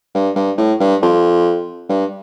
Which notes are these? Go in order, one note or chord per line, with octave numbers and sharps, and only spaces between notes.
G2
G2
A2
G2
F2
G2